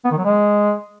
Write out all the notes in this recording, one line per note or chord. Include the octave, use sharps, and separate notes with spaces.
B3
D#3
F#3
G#3